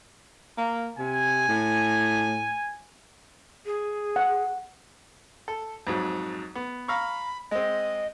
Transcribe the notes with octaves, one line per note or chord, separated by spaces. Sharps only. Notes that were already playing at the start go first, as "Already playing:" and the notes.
A#3
C3 G#5
A2
G#4
F#5
A4
F2 G#2 F#3
B3
F5 A#5 B5 C#6
G#3 C4 D#5